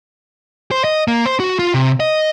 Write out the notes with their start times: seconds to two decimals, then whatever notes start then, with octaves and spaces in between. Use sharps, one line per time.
0.71 C5
0.84 D#5
1.08 A#3
1.26 C5
1.40 F#4
1.59 F4
1.74 C3
2.00 D#5